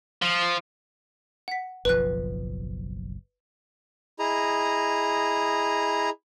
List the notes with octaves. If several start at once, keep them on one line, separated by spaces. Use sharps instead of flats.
F3
F#5 B6
F#1 B1 F3 B4 F#6
E4 G#4 D#5 A#5